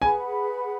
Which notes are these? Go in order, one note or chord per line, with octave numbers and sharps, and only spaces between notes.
G#4 B4 F#5 G#5 B5